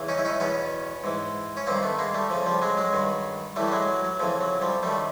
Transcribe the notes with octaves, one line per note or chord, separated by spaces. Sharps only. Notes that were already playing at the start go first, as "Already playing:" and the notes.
Already playing: E2 C#3 E3
C#4 D#4
E4
C#4 D#4
E2 B2 B3 C#4
G#2 E3
C#4
G2 D#3 A#3 C4
A3 B3
G#3 A#3
G3 A3
F2 C#3 F3
F3 G3
F#3 G#3
F#3 G#3
G2 D#3
A2 E3 G3 A3
G3
F#3 G#3
F#3
F#3
F2 C#3 E3 F3
F#3
F3 G3
F#2 D#3 G3 A3